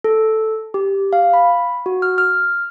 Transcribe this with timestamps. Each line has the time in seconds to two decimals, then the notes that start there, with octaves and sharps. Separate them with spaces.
0.04 A4
0.74 G4
1.13 F5
1.33 B5
1.86 F#4
2.02 F6
2.18 F6